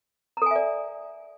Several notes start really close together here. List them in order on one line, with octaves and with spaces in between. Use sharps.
A#5 A4 G#5 E5 D5